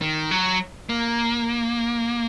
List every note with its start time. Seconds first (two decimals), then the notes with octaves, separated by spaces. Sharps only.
0.01 D#3
0.31 F#3
0.89 A#3